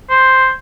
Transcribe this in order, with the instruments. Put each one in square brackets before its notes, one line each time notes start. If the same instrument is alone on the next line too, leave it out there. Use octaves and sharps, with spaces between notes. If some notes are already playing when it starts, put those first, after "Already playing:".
[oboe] C5